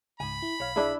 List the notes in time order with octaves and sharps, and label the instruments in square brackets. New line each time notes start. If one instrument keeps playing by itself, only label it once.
[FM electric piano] C#2 G#2 [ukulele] G#5 [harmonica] B5
[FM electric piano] E4
[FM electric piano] B1 F5 [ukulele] C#5
[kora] D4 E4 [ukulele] G#4 E5